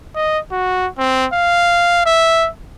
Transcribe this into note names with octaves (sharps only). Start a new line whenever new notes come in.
D#5
F#4
C4
F5
E5